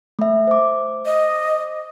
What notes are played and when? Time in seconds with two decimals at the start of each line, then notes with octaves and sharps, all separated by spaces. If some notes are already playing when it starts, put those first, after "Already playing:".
0.19 A3 E5
0.47 C5 D6
1.06 D#5